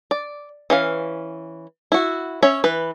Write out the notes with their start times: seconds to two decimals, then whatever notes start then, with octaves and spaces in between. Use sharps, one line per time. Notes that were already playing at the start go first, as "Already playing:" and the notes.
0.11 D5
0.70 E3 C#4 F5
1.92 E4 F#4
2.43 C#4 C#5 E5
2.64 E3 B4